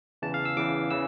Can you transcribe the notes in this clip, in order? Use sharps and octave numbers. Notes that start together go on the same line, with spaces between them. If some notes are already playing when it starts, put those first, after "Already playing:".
E2 C#3 E3 A5
F5
E6
E2 C#3 E3 D6
C#3 E3 E6